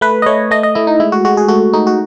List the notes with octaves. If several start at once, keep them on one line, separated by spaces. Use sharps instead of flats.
A3 B4
D#5
A3 C#5
A3 D#5
D#5
A3 E4
D#4
G#3 E4
F#4
G#3 F#4
G#4
A3 F#4
A3 D#4
F#4